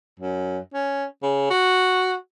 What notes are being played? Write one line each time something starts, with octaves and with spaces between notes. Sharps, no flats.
F#2
C#4
C#3
F#4